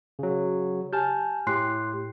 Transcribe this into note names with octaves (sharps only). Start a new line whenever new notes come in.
C#3 F#3
G4 G#5 A5 F6 G6
A2 G4 C6 F#6 C7